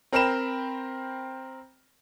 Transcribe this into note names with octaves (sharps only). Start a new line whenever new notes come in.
C4 A#4 C5 G5 B5 E7